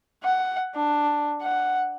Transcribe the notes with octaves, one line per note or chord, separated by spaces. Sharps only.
F#5
D4
F#5